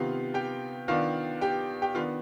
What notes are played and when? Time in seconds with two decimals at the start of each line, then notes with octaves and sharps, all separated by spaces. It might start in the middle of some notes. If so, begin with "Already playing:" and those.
Already playing: C3 D#3 B3 F4 F5
0.34 G4 G5
0.88 D#3 B3 D4 F4 F5
1.41 G4 G5
1.82 G4 G5
1.95 D#3 B3 D4 F4 F5